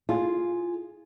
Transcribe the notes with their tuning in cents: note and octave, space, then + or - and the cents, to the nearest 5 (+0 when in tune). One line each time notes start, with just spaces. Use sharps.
F4 +0 G#4 +0